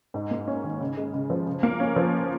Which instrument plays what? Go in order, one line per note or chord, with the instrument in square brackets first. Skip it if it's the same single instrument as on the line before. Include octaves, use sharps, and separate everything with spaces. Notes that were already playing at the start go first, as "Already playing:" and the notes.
[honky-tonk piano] G#2
A#3
C#4
D#3
C#3
G#3
C#3
F3
C#3
A#3
C#4
F3